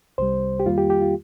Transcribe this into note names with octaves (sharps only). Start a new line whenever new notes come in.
C2 C3 G3 C5
G4
F2 D#3 G3 A#3 F4
G4
G4
F4